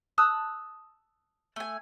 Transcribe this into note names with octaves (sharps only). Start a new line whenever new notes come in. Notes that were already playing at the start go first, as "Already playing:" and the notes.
A5 D#6 E6 F#6
A3 G#5